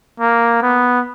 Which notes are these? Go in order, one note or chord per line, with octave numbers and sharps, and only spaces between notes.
A#3
B3